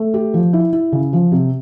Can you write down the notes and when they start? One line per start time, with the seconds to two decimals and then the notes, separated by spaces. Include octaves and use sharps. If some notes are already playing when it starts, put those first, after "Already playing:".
Already playing: A3
0.14 G4
0.34 F3
0.53 E4
0.73 E4
0.92 C#3
1.13 F3
1.32 C3